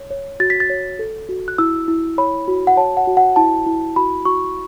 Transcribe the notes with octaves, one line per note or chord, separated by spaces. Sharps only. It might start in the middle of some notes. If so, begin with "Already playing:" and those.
Already playing: C#5
C#5
F#4 A6
B6
A6
C#5
A4
F#4
F#6
E4 E6
E4
C#5 B5
F#4
F#5
C#5 A5
F#5
F#4
F#5
E4 A5
E4
F#4 B5
F#4 C#6